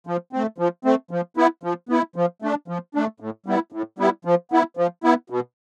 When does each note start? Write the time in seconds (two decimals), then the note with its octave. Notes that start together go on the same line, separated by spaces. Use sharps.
0.07 F3
0.33 A3 C4
0.58 F3
0.85 A3 C4
1.11 F3
1.37 B3 E4
1.63 F3
1.89 B3 E4
2.16 F3
2.42 A3 D4
2.68 F3
2.95 A3 D4
3.20 A2
3.46 G3 B3 E4
3.72 A2
3.99 G3 B3 E4
4.25 F3
4.52 B3 E4
4.77 F3
5.04 B3 E4
5.30 B2